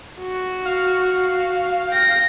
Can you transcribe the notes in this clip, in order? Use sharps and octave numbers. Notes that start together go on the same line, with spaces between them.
F#4
F5
G5 A#6